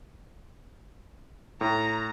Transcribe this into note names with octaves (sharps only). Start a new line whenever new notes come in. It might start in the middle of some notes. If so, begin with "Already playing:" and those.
A2 A#5